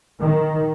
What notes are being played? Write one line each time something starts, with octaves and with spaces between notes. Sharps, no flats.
D#3